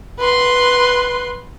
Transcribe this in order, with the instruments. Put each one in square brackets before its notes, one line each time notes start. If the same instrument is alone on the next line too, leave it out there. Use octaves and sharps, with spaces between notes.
[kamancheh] B4 C6